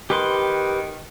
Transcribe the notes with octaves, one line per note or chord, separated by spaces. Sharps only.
D#3 G4 B4 C6